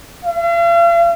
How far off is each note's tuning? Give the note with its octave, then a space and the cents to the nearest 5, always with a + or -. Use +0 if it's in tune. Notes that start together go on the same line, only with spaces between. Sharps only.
F5 -45